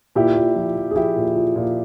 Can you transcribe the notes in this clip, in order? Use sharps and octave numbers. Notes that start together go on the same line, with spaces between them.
A#2 E4 G4
A#2
F3
F3
G#4
F3 E4 G4
A#2
F3
A#2